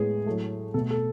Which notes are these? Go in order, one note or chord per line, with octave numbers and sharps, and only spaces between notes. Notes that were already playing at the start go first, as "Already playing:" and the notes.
Already playing: A2 G#3 B3 G#4
A2 F#3 A3
B2 A3 A4
A4